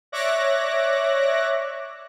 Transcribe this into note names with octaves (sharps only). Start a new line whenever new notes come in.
C#5 D5 E5 D6 F#6 A#6